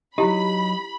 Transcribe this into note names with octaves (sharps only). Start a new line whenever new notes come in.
F#3 D#4 E4 G4 B5